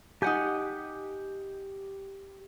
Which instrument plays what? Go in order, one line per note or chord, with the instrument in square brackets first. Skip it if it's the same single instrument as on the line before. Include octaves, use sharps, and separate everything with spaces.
[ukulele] D#4 F#5 G#5 [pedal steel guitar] G4 G6